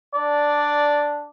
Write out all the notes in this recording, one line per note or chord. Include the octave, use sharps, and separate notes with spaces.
D4 D5